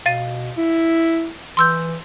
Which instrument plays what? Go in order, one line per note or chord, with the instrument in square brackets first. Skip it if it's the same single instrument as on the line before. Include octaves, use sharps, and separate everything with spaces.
[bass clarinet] B2 [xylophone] F5 A6 D#7
[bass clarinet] E4
[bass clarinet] E3 [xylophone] C6 E6 G6